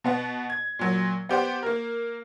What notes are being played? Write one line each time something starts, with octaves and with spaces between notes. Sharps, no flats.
B2 B3 F#5
G#6
A#2 F#3
B3 G4 C5 F#5
A#3 A#4